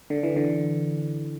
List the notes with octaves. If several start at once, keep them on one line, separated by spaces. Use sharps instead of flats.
D3
E3
D3